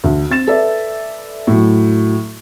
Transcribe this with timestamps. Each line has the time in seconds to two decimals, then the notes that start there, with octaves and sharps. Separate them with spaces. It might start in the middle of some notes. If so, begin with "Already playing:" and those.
0.04 D2
0.30 C4 A6 E7
0.47 A4 B4 D5 E5
1.47 A2 F#3